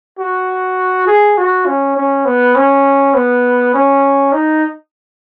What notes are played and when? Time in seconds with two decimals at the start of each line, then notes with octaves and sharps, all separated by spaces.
0.19 F#4
1.07 G#4
1.38 F#4
1.66 C#4
1.97 C#4
2.25 B3
2.55 C#4
3.15 B3
3.74 C#4
4.33 D#4